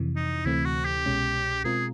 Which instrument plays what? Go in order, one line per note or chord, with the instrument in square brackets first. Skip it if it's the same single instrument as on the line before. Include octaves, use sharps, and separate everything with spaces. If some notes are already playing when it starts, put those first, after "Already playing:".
Already playing: [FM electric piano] F2 C3 E3
[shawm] D#4
[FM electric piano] D2 C3 E3 A3 C4 [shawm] E4
[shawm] F#4
G4
[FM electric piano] C2 B2 G#3 C#4
[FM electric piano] B2 G#3 C4 F4 A#4 [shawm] G#4